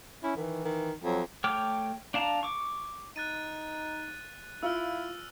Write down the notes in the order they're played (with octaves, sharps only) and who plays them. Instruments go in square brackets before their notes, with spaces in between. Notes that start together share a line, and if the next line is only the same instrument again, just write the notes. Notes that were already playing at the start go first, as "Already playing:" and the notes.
[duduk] C#4 [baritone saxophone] E4
[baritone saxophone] D#3 [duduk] E3
[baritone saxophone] D#3
[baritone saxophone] F2 [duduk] F#3
[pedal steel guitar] A3 C#5 G5 D6 F6
D4 F5 A5 A#5
C#6 D6
[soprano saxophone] D#4 [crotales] F#6 A6 D#7
[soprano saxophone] E4 [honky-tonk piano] F4 [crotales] E6 F6